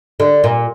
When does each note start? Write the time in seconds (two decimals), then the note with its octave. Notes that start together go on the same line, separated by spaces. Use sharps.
0.20 D3
0.44 A#2